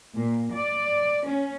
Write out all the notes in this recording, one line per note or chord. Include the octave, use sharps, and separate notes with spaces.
A#2
D5
C#4